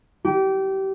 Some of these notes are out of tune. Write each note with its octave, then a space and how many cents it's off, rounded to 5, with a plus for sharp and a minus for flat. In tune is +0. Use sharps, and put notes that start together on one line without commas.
G4 -25